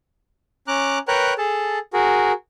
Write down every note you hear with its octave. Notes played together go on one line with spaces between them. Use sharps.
C#4 A#5 D6 F#6
A#4 B4 C#5 G5 A#5 F#6
G#4 A4 A5
F#4 G#4 A#4